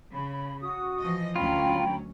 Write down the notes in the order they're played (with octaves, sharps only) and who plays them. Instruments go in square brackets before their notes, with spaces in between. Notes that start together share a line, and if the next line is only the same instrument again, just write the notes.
[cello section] C#3 [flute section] B5
[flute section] F#4 D#6
[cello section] E3 F3 D#5
[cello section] D2 F#3 C#4 [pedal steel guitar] F4 [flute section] G5 A#5 B5